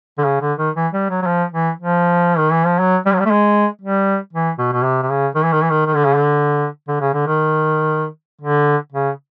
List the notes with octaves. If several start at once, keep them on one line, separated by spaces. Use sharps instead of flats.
D3
C#3
D3
D#3
E3
G3
F#3
F#3
F3
E3
F3
D#3
E3
F3
F#3
G3
F#3
G3
A3
G#3
G3
E3
B2
B2
C3
C3
C#3
D#3
E3
D#3
E3
D#3
D#3
D3
C#3
D3
D3
C#3
D3
D#3
D3
C#3